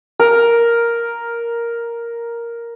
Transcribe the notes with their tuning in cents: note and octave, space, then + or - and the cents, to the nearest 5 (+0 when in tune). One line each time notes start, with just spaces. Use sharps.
A#4 +5